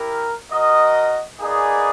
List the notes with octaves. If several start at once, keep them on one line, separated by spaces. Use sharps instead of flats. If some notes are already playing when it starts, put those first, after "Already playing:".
Already playing: E4 G4 A#4
F#4 A#4 D#5
A#3 D#4 G#4 B4 D5